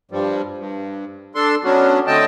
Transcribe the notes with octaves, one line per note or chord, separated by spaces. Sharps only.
G2 F3 G3
G2
D4 A4 C6
F#3 B3 C#4 D4 F#4
D3 A3 C4 D#5 G5 A5